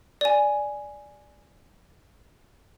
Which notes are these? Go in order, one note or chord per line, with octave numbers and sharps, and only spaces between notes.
D5 G#5